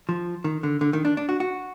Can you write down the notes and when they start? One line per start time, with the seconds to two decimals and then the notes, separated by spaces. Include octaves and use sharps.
0.09 F3
0.44 D#3
0.63 D3
0.81 D3
0.93 D#3
1.05 D4
1.17 D4
1.29 F#4
1.40 F#4